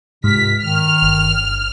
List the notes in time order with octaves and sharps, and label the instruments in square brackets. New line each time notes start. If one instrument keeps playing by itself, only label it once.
[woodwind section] C#2 C3 F6 [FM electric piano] G#2 [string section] B6
[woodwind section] D#3 [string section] F6
[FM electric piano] G1